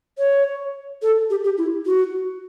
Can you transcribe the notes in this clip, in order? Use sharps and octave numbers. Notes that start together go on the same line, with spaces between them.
C#5
A4
G4
G4
E4
F#4